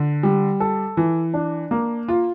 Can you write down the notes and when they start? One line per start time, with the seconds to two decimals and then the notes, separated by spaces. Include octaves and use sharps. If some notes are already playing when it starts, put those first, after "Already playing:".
Already playing: D3
0.23 G3
0.60 A4
0.97 E3
1.34 D4
1.71 A#3
2.08 F4